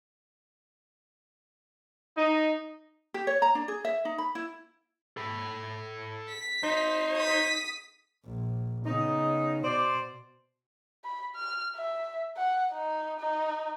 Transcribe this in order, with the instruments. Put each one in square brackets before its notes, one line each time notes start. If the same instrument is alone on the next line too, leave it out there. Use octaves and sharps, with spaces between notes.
[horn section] D#4
[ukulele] G4
C#5
A#5
D4
G#4
E5
D#4
B5
E4
[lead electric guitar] A4 B5
[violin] B6
[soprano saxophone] D#4 [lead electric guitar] C5
[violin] D#6 B6
[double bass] A#1
[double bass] C#3 B3 [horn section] D#4
[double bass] B2 [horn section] C5 D5
[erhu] B5
F6
E5
F#5
D#4
D#4